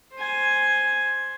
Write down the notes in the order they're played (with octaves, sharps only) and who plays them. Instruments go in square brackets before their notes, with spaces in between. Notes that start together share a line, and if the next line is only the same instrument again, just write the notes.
[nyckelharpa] C5 G#5